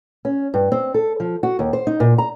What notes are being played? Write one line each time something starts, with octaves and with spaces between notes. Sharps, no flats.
C#4
G2
C4
A4
F3
F#4
D#2
C5
D#4
A#2
A#5